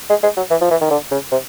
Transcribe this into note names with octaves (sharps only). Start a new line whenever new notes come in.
G#3
G#3
F#3
E3
F3
E3
D#3
D3
C#3
C3